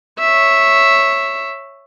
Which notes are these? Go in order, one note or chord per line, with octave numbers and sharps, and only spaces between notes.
C#5 E5